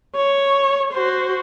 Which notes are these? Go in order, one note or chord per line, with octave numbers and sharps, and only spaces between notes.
C#5
F#4 C5